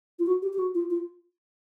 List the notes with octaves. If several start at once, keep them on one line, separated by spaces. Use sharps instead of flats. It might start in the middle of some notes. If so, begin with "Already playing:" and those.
F4
F#4
G4
G4
F#4
F4
F4